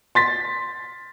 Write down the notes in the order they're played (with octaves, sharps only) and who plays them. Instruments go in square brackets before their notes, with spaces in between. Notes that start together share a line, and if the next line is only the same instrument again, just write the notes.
[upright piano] C6 A6 B6